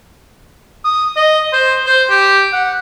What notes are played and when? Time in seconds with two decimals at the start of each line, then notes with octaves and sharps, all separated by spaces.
0.84 D#6
1.16 D#5
1.53 C5
1.86 C5
2.10 G4
2.53 F#5